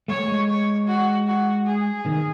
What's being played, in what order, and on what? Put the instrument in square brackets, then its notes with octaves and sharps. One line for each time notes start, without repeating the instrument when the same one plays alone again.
[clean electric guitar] A3 [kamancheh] C#5
[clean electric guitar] G#3
[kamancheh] C#5
F#4
F#4
G#4
[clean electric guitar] D#3